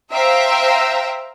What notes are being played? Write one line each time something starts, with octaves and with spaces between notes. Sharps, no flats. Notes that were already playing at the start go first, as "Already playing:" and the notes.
C5 E5 F5 G5 A#5